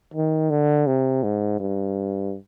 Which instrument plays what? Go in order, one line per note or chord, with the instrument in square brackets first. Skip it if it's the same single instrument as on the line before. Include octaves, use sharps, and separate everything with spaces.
[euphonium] D#3
D3
C3
G#2
G2